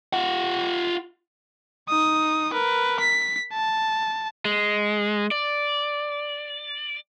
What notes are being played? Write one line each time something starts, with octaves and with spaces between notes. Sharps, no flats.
F4 F#5
D#4 D#6
A#4 B4
B6
A5
G#3
D5